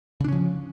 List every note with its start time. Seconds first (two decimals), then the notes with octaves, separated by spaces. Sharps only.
0.20 C#3
0.24 D4
0.28 C#4
0.32 F3